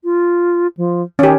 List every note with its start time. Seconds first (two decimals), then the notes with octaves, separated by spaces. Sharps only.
0.04 F4
0.77 F3
1.19 D#3 C#4 G4